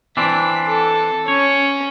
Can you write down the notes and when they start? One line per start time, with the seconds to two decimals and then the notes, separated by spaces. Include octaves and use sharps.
0.17 E3 C4 D4 B6
0.67 A4
1.28 C#4 C#5